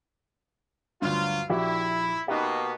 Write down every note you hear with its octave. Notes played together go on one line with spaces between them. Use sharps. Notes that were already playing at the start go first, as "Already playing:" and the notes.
D2 G2 F#3 F4
A#1 E4 F#4 G4
B2 A#3 B3 D#4 G4